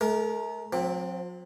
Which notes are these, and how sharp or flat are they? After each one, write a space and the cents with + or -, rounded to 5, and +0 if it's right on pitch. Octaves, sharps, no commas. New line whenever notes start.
A3 -40 A#4 +0
F#3 -45 C4 +0